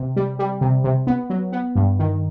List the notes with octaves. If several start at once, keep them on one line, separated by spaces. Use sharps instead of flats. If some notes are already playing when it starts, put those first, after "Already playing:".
Already playing: C3
G3
G3
C3
C3
B3
F#3
B3
G2
D#3